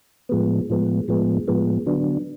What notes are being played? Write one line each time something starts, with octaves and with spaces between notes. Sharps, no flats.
A2 F3 G#3 B3
A2 F3 G#3 B3
A2 F3 G#3 B3
A2 F3 G#3 B3
D3 F#3 B3 D4